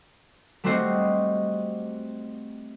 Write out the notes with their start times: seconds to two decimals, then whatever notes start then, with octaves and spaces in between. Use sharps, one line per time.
0.64 G3 A3 C4 F#4 C5 D#5